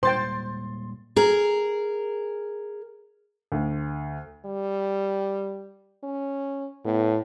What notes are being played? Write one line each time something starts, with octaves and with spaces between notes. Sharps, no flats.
A#2 G3 G#3 C5 G5 C6 A6
G#4 A#4
D2
G3
C#4
A2 B3